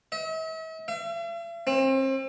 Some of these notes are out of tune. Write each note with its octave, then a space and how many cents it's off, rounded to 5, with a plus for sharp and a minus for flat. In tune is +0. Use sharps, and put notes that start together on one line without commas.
E5 -45
E5 +45
C4 +35